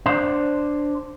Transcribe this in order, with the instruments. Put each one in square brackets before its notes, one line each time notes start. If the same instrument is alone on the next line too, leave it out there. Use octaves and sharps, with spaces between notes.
[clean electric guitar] D4 C5